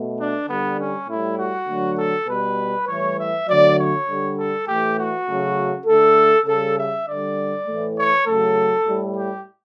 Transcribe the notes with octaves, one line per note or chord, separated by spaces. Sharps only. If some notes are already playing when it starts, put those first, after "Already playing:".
Already playing: B2 A3
D4
D3 G3 B3
C#4
A2 G3 E4
F#4
D3 F#3 A3
A4
B2 G3 B4
A2 E3 G3 C#5
E5
D3 F#3 A3 D5
C#5
D3 G3
A4
A2 E3 A3 G4
F#4
C#3 F#3 A3
D3 A3 A4
C#3 G3 A4
E5
D3 G3 D5
A2 E3 A3
C#5
C#3 F#3 A3 A4
A2 G3
G4